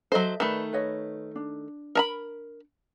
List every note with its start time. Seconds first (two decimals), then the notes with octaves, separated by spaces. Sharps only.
0.12 F#3 A4 C5 D#5 E5
0.40 D#3 A3 B4 D5 B5
0.73 B4 C#5 D#5
1.36 D4
1.95 A#4 A#5 B5